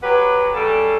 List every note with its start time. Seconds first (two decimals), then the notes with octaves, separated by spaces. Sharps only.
0.02 F#3 G4 B4 F#5
0.53 C#3 G3 A4